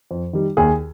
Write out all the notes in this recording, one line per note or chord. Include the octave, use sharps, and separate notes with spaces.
F2
D#3 G3
D#2 G#4